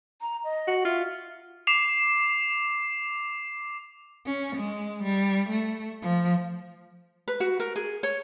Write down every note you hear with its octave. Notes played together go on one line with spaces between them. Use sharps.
A#5
D#5
F#4
F4 E5
D6 C7 E7 F7
C#4
G#3
G3
A3
F3
B4
F#4
A#4
G#4
C#5